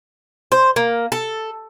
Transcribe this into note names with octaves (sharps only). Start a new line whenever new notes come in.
C5
A#3
A4